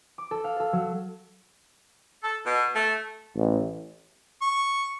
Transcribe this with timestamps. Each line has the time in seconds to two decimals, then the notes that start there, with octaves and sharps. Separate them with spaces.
0.18 D6
0.31 A4
0.44 F5
0.60 A4
0.73 F#3
2.23 A4
2.45 B2
2.75 A3
3.36 A1
4.42 C#6